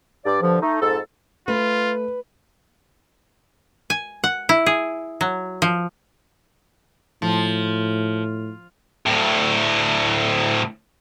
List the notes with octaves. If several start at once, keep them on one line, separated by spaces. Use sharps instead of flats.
G2 D5
G2 D3 F3
A3 D#4
F2 G#2 A4
A3 F4 B4
G#5
F#5
E4
G#4
F#3
F3
A2 F3
D2 A2